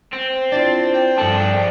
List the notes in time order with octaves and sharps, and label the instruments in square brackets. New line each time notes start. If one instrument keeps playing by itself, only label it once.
[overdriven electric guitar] C4
[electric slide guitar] D4 E4 F4 [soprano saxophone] D5
[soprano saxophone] G5
[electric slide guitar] G2 A4 A5 [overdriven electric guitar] F3 D4